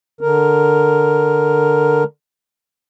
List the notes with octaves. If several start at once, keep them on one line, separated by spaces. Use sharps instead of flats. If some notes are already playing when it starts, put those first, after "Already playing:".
D3 A#4